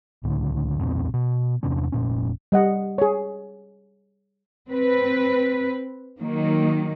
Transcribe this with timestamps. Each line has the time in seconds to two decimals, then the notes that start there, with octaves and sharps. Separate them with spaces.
0.24 C#2 A2 D3
0.79 B1 E2 A#2 C4
1.14 B2
1.63 E2 C3 C#4 D4
1.92 F1 A#2 C#4
2.52 G3 D#5 F#5
2.98 G#4 C#5
4.68 C4 B4
6.20 D#3 F#3 A#3